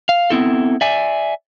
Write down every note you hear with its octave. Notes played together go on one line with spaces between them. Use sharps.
F5
B3 C4 E4 A4
D5 E5 G#5